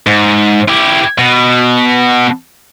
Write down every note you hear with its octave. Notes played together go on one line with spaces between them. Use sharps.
G#2
E4 G4
B2